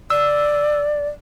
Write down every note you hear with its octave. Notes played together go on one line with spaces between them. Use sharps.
D5 E6